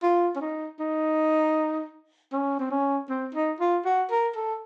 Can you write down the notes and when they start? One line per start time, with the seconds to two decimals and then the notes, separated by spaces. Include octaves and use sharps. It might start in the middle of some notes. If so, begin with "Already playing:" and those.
0.02 F4
0.36 C#4
0.41 D#4
0.79 D#4
2.33 C#4
2.59 C4
2.71 C#4
3.09 C4
3.34 D#4
3.60 F4
3.85 F#4
4.11 A#4
4.36 A4